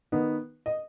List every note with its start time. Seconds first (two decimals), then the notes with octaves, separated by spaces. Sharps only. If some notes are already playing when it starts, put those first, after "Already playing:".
0.12 D#3 B3 D#4
0.66 D#5